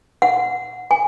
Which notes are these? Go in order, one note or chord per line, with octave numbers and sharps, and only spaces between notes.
F#5
G#5